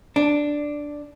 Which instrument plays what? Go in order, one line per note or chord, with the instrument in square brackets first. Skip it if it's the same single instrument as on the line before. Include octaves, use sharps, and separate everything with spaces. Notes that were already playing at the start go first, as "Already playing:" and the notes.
[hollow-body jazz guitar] D4